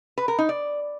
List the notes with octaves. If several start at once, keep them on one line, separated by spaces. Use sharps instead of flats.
B4
A#4
D#4
D5